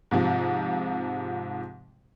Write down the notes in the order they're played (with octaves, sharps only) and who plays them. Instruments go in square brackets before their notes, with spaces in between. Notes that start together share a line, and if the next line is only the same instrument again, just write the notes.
[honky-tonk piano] G#2 C3 F3